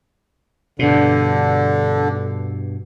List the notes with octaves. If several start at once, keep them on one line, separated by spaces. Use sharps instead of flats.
G2 B2 D3